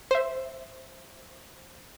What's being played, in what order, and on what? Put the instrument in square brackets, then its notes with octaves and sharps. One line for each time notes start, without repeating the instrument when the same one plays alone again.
[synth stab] C5 E5